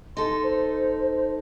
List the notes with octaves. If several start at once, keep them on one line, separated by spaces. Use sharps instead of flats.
D#4 A4 C6
C5